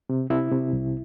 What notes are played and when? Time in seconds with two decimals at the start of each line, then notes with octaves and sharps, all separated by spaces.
0.09 C3
0.30 C3 E4
0.52 C3
0.73 C2